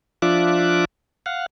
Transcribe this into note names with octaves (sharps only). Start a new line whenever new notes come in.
F3 D4 F4 E5 D6 F#6
F5 F#5